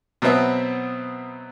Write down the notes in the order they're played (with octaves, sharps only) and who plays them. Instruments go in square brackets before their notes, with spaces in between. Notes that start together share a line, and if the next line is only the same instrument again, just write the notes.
[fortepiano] B2 F#3 B3 C4 E5